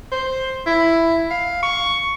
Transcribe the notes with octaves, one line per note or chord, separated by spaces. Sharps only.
C5
E4
F5
C#6